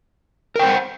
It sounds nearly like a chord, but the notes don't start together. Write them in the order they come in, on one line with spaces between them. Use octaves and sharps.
A#4 G5 C5 F#5